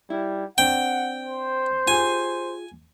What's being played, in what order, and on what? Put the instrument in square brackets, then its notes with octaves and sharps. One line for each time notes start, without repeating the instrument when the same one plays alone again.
[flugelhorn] G3 [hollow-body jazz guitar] E4
[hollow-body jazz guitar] C4 D4 [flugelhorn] F#5 [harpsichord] G5
[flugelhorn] C5
[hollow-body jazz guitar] F4 G4 G#4 [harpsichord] G#5